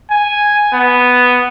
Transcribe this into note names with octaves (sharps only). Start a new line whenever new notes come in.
G#5
B3